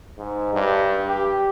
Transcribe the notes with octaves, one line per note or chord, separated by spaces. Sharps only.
G#2
G2
G4